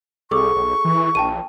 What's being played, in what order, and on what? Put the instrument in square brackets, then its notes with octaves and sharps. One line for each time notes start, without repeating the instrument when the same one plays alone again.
[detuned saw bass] C2 [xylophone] G#4 A4 D6 [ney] C#6
[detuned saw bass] B1
E3
[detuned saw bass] A#1 [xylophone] G5 A5 D#7